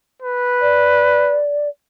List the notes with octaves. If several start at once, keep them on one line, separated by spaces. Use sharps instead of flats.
B4
D5